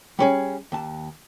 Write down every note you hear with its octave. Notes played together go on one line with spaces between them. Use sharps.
G3 C#4 G#4
D#2 A5